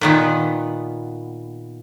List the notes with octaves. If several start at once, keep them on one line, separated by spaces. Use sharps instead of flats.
A#2 D#3 B3